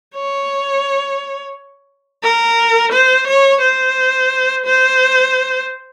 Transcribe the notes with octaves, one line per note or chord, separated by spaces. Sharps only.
C#5
A#4
C5
C#5
C5
C5